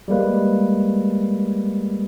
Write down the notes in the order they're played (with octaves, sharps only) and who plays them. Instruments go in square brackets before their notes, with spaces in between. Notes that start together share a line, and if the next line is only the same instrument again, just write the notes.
[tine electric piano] G3 G#3 A#3 B4